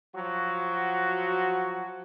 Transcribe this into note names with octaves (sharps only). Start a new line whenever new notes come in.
F3 F#3 F#4